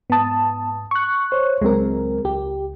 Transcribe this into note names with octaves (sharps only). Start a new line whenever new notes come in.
G#2 B3 A5 D#6
C#6 F#6
C5 C#5
C#2 F#3 G#3 C4 A#4
C#2 G4